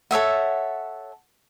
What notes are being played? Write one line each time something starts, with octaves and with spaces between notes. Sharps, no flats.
A4 C#5 E5 F#5